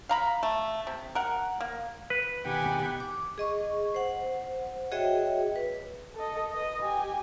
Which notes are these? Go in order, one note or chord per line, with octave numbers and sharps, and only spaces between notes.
F5 A#5 B5
A3
C3
A#4 F#5
A#3
B4
B2 D#3 G4 F#5 G#5 B5
D6
G#4 D#5 C#6
C5 F#5
F#4 G#4 C#5 D#5 E5 G5
B4
A4 D#5
B4 D#5
G4 G#5